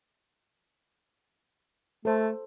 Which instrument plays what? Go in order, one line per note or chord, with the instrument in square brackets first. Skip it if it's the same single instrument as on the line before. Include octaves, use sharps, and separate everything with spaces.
[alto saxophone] A3 [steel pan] A4 C5